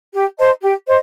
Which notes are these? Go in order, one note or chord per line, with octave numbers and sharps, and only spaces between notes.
G4
C5 D#5 A5
G4
C5 D#5